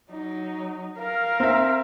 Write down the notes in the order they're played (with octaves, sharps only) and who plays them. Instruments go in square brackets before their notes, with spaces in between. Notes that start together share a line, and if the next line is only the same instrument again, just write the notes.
[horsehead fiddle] F#3 D#4
A#4 F5
[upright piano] C4 E5